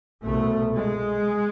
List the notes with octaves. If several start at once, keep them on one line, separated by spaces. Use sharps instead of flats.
C2 B2 A3
G#3